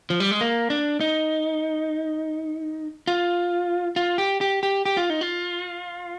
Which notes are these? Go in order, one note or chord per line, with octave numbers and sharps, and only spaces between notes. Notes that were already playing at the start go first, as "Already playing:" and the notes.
F3
G3
G#3
A#3
D4
D#4
F4
F4
G4
G4
G4
G4
F4
D#4
F4